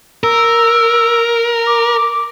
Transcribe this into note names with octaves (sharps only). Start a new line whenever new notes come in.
A#4 E6
D6